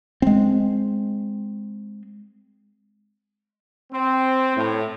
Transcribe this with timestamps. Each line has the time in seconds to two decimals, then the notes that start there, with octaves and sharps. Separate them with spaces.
0.22 G#3 C4
3.91 C4
4.56 A2